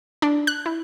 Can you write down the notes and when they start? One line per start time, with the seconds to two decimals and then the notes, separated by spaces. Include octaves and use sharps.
0.22 D4
0.47 F#6
0.66 E4